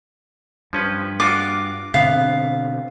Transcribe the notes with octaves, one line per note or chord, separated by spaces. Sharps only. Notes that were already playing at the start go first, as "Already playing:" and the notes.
G2 F3 C#4 B4
D4 F4 F#4 D6
B2 D3 B3 C4 F5